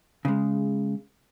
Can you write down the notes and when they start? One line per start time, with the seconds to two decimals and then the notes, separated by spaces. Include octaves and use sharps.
0.25 C#3 G#3